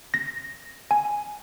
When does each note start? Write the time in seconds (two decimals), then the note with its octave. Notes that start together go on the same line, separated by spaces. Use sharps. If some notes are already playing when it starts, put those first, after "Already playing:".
0.14 A#6
0.91 G#5